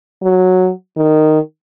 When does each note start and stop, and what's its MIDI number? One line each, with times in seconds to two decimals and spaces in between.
0.22 0.70 54
0.97 1.39 51